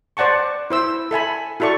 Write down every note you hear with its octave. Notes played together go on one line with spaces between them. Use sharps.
C5 D5 F#5 A5 C#6
E4 C5 E6
A4 E5 G#5 B5
E4 F#4 A4 D5 C#6